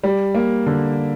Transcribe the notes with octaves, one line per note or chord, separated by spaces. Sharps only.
G3
A#3
D3